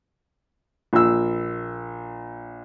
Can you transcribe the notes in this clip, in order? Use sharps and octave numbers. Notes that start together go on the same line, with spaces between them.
A#1 E6